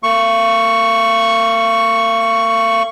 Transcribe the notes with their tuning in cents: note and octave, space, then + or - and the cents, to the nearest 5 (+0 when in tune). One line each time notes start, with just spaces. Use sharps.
A#3 -40 C#6 +0